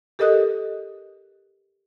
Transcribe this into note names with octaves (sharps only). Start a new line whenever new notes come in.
G4 A4 A#4 D#5 D#6 F#6